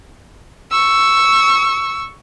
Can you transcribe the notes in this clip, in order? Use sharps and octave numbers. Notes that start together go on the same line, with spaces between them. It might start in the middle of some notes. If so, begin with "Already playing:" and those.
C#6 E6